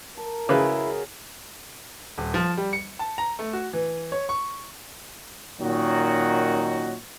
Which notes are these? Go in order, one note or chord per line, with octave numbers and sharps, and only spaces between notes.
A#4 A5
C#3 F#3 G#3 E4 G#4 B4
D#1
F3
G3
C#7
A5
A#5
A3
F#4
E3
C#5
C#6
A#2 D#3 F#3 C#4 D#4 F#4